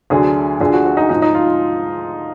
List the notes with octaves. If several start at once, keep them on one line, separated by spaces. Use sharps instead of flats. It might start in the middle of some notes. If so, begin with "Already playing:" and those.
D2 D3 F#3 G#4
D2 D3 F3 G#4
F#4
F#4
D#4
G#2 F3 D#4
D#4
F4